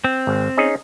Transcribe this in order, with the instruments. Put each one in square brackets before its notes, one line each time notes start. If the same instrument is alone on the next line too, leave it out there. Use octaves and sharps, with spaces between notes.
[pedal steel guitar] C4
[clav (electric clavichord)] G#1
C#4 D#4 G#4